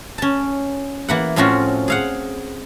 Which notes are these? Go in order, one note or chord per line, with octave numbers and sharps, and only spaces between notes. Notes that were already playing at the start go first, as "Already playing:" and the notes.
C#4 A5
E3 A#3 F#5
A2 F3 C4 C#4 F4 F#4
G#4 F5 F#5